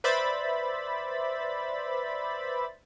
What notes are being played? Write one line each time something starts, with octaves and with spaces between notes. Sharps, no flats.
B4 C5 D5 E5 B5 A6